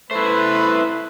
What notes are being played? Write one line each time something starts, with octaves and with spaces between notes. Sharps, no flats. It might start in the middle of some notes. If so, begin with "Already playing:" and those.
A3 E4 B4 C5